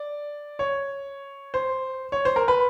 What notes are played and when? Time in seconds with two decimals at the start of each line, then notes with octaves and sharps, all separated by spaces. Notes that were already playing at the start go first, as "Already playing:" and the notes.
Already playing: D5
0.59 C#5
1.54 C5
2.12 C#5
2.25 C5
2.36 A#4
2.48 B4